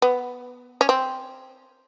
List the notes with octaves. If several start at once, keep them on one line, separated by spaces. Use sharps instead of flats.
B3
C#4
C4